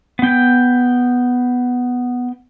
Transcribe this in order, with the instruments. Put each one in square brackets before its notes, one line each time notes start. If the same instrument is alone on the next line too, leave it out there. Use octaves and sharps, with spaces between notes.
[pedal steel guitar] B3 G5